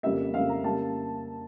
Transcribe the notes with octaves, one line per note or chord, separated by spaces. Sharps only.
F2 C#3 G3 A#3 E5
F2 C#3 G3 A#3 F5
A#5
C#3 G3 A#3 A5